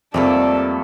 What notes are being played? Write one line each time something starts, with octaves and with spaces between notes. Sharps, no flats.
F2 G3 A3 A#3 D5 A5